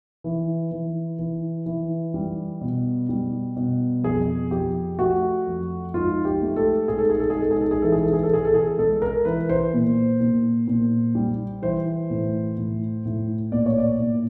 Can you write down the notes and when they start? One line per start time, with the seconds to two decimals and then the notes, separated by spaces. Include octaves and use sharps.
0.24 E3
0.71 E3
1.19 E3
1.66 E3
2.14 G3
2.61 B2
3.09 G3
3.57 B2
4.03 F2 G#4
4.51 F3 G4
4.98 A3 F#4
5.46 F2
5.94 G#2 F4
6.25 G4
6.42 A3
6.56 A4
6.88 G#2 G#4
6.98 A4
7.10 G#4
7.20 A4
7.30 G#4
7.36 G#2 A4
7.51 G#4
7.61 A4
7.71 G#4
7.82 E3 A4
7.92 G#4
8.03 A4
8.13 G#4
8.23 A4
8.30 E3 G#4
8.45 A4
8.54 G#4
8.78 G#3 A4
9.02 A#4
9.25 E3 B4
9.49 C5
9.73 A#2
10.20 A#2
10.67 A#2
11.15 G3
11.62 E3 C5
12.10 A2
12.57 A2
13.05 A2
13.52 A#2 D5
13.66 C#5
13.78 D5
13.99 A#2